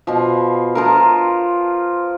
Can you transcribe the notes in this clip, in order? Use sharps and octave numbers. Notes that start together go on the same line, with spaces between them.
B2 F3
F3 F4 A#4